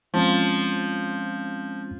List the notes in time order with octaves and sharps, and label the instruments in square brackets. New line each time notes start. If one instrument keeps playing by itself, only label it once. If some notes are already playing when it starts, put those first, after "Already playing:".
[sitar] F3 [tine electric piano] G#3 C4 C#4